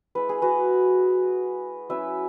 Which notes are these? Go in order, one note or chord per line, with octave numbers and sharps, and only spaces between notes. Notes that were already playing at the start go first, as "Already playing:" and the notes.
G#3 E4 B4
G#4
F#4 B4
F#3 C#4 E4 B4 E5